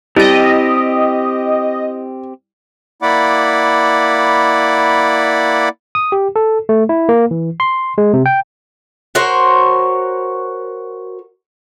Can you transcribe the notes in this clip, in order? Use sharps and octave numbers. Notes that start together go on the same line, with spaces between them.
G3 C4 E4 G4 D#5 A6
A#3 E4 D5 F#5 B5 D6
D#6
G4
A4
A3
E4
A#3
E3
C6
G#3
C3
G5
F#4 A#4 C5 C#5